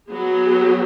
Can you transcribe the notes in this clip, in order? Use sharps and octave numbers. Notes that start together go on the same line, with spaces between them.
F#3 B3 G#4